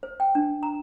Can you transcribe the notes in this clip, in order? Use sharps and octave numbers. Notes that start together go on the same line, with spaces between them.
C5
G5
D4
A#5